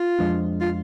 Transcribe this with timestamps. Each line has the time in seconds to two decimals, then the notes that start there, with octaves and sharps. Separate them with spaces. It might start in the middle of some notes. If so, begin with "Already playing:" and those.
Already playing: F4
0.19 F2 F3 G#3 D4
0.61 F4